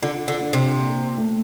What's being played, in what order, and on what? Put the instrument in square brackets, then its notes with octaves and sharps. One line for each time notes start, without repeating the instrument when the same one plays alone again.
[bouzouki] D3 [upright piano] F4
[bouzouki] D3
[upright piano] D4
[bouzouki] C3
[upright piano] A#2
A3